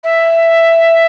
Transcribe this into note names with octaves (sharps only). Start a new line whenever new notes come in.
E5